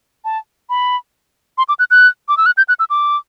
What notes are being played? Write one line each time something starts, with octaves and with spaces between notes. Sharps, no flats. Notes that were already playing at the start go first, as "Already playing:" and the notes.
A5
B5
C6
D6
F#6
F#6
D6
E6
F#6
G6
F#6
E6
D6